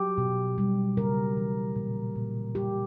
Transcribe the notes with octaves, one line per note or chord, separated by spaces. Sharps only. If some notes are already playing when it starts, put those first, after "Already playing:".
Already playing: F#3 G4
B2
G3
C#3 A#4
E3
A#2
A#2
G3 G4